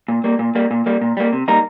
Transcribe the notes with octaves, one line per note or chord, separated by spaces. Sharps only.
A#2
G3 A#3
A#2
G3 A#3
A#2
G3 A#3
A#2
G3 A#3
C3
G3 A#3 D#4 A#4